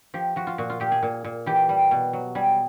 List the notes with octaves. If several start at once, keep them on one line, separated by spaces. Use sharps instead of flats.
F3 G4
F3 F#4
F4
A#2 F#4
F4
A#2 G4
G#4
A#2
A#2
E3 G4
G3
B2
F#3
G3 G#4